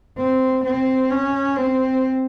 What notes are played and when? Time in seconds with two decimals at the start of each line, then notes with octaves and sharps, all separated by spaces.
0.18 C4
0.64 C4
1.10 C#4
1.56 C4